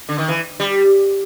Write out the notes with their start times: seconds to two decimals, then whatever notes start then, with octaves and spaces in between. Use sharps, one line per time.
0.09 D3
0.18 D#3
0.29 E3
0.60 G3